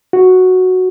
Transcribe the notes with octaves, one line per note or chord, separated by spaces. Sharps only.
F#4